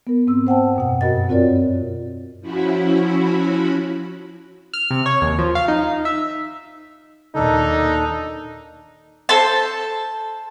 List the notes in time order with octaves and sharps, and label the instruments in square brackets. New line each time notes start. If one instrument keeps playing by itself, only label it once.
[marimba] B3 A#4
G#2 C4 E6
C5 F#5 G5 A5
F#2 B2 F#5
G2 B2 F#4 A#4 D#5 A6
C4 F4 F#4 A#4 C#5 D5
[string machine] F3 C#4 E4 F#4 B5
[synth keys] F6
C3
C#5
D#2
F3
F5
D#4
E5
[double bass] D#2 A#2 [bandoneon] D4 A4 [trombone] D#4
[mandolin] A4 C5 A5